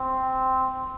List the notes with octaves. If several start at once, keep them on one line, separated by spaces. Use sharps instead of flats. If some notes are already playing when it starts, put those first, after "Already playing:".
Already playing: C4